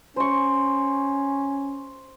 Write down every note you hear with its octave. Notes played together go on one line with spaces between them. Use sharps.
C#4 C5 C#6